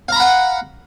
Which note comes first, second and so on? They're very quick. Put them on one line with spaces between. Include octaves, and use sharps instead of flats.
F5 A#5 B5 F#5